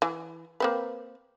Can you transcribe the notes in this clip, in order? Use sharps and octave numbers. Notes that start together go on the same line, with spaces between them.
E3
A#3 C4 B4